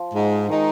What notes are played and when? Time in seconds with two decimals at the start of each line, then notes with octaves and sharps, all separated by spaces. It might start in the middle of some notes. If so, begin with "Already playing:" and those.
Already playing: F3
0.14 G#2
0.48 D#3 G#3 D#4